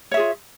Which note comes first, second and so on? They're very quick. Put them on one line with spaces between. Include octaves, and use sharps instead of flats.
C#5 E5 G#4 F4